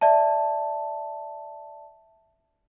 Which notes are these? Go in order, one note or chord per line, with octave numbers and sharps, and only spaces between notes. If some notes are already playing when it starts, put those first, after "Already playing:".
D5 E5 A5